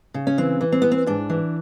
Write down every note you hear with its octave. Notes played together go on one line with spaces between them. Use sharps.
C#3
C#4
E3 C4
E3
C4
E3 B3
C4
G#2 D4
E3